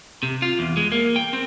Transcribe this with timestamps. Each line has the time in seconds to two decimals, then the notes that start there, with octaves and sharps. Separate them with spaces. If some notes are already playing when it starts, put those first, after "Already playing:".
0.23 C3
0.42 F4
0.59 E2
0.77 G#3
0.92 A#3
1.16 G5
1.33 C4